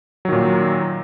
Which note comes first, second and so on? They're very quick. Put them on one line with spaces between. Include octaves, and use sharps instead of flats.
F#3 D#3 A#2